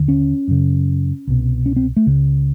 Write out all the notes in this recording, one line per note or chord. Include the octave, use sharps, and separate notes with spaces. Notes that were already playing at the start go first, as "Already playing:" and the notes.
Already playing: D#2 D3
C#4
F#2 C#3
C2 B2
C#4
C4
A3
C#2 C#3